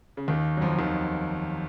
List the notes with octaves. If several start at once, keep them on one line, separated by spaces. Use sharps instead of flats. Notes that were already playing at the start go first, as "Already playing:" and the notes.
C#3
D#2 D#3
F#3
F2 F3
D#2 D#3